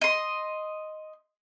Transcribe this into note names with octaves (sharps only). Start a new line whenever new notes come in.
D#5 C6